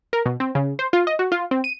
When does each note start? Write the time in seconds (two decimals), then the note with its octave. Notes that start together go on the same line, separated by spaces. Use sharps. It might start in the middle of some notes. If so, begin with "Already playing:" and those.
0.13 A#4
0.26 B2
0.40 C4
0.55 C#3
0.79 C5
0.93 F4
1.07 D#5
1.19 F#4
1.32 F4
1.51 C4
1.64 D#7